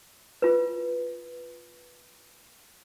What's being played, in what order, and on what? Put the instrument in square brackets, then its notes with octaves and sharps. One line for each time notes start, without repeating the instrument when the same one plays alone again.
[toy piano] F4 B4